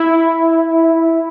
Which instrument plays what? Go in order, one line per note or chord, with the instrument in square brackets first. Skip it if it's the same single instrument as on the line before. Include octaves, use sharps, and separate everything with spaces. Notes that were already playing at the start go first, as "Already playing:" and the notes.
Already playing: [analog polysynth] E4